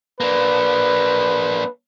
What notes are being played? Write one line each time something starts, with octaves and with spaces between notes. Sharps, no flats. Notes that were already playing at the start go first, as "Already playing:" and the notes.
A#3 D4 B4